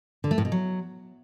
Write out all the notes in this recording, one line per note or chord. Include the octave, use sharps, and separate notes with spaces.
D3
A3
A2
B2
F#3